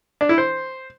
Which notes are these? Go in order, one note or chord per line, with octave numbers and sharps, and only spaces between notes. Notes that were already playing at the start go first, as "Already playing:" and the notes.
D4
E4
C5